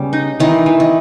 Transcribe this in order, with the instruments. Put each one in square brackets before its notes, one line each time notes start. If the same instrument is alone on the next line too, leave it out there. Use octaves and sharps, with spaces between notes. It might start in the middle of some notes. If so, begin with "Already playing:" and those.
Already playing: [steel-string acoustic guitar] C#3 [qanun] G3 B3
[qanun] D#4
[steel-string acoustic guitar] D#3 [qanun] E3
[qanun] E3
[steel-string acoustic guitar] D#3